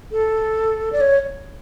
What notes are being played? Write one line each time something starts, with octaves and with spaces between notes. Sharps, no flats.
A4
D5
C#5